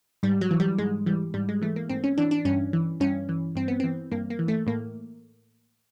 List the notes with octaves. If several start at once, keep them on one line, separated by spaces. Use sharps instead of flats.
G#2 G3
F#3
E3
G3
G#2 G#3
E3 G3
G#2 G3
G#3
E3 A3
A#3
G#2 C4
C#4
E3 D4
D4
G2 C#4
E3
G2 C#4
E3
G2 C4
B3
E3 C4
G2 A#3
A#3
E3
A3
A2 A#3